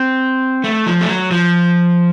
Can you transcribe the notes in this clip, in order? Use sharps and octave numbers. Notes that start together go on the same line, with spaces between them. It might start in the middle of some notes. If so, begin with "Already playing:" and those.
Already playing: C4
A3
F3
A3
F#3
F3